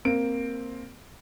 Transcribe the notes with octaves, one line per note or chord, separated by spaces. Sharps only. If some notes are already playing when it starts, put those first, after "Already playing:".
A#3 C4 D7